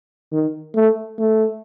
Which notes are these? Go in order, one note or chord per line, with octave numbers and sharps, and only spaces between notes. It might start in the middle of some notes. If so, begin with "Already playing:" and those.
D#3
A3
A3